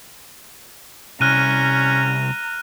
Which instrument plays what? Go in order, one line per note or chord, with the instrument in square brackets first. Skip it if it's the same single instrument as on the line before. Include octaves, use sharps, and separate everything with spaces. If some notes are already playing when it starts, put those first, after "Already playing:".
[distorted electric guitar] C2 [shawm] C#4 [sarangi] A#5 [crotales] F6 F#6 D#7